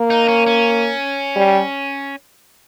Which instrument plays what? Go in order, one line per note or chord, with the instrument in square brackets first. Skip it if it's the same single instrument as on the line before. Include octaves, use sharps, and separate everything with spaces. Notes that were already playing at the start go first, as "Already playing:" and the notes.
Already playing: [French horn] A#3
[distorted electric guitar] D#4
C#4
C#4
[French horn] G3